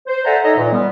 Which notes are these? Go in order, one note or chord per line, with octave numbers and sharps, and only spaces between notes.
C5
A4 D5 E5 F#5 G#5 A#5
D#4 A4 C#5 D#5 E5 A#5
A#2 E3
G3 B3